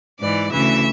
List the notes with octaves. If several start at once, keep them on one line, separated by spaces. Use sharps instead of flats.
G#2 E3 D5
D2 C#3 E3 E5